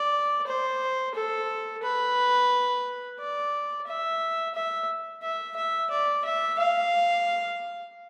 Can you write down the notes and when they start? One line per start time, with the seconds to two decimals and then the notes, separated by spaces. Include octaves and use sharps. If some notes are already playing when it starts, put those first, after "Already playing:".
Already playing: D5
0.47 C5
1.14 A4
1.82 B4
3.19 D5
3.87 E5
4.54 E5
5.22 E5
5.56 E5
5.90 D5
6.24 E5
6.58 F5